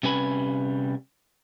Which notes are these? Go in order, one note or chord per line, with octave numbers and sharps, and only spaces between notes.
C3 G3 C#4 B4 G#5 B5